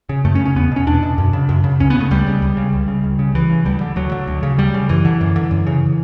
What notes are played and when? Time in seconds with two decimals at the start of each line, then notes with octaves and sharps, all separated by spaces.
0.09 C#3
0.25 F#2 A3
0.35 C#4
0.40 C#3
0.45 C#4
0.56 E2 B3
0.71 B2 C#4
0.87 E2 D4
1.03 B2
1.18 F#2
1.33 C#3
1.49 F#2
1.64 C#3
1.80 C#2 C#4
1.90 B3
1.95 C#3
2.00 A3
2.11 C#2 G3
2.26 C#3
2.42 C#2
2.57 C#3
2.73 C#2
2.88 C#3
3.04 C#2
3.19 C#3
3.35 C#2 E3
3.50 C#3
3.65 D2 G3
3.81 D3
3.96 D2 F#3
4.12 D3
4.27 D2
4.43 C#3
4.58 D2 G3
4.74 C#3
4.89 F#2 E3
5.05 D3
5.21 F#2
5.36 D3
5.51 F#2
5.67 C#3